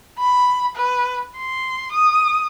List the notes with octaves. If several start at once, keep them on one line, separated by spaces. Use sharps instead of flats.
B5
B4
C6
D#6